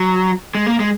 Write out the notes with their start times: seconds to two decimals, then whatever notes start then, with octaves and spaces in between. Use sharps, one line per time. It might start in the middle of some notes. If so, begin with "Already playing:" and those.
Already playing: F#3
0.55 G#3
0.66 A#3
0.80 G#3